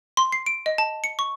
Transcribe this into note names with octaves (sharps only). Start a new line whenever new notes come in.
C6
C7
D7
D#5
A5
C#7
C#6